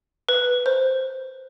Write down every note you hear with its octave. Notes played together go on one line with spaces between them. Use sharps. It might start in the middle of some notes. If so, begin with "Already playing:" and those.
B4
C5